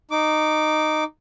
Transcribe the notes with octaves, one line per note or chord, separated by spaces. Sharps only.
D#4 D6